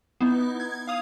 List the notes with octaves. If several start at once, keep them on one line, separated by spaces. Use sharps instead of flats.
B3 D#4 E4
G#6
F5 D#6 F7